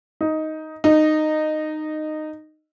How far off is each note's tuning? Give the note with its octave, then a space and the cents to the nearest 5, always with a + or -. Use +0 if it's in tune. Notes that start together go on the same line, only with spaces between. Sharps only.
D#4 +5
D#4 -15